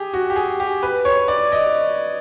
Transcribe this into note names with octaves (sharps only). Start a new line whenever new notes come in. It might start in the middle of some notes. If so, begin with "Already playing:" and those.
Already playing: G4 G#4
F#4
G4
G#4
G4
B4
C#5
D5
D#5